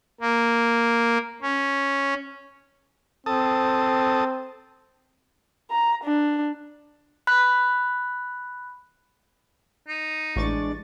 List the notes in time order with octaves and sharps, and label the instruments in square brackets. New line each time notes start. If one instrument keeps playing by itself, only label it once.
[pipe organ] A#3
C#4
[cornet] C4 [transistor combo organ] A4 A5 D#6
[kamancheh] A#5
D4
[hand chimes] B5 F#6
[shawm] D#4
[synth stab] A1 C#6 A6 [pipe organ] G#3 D4 D5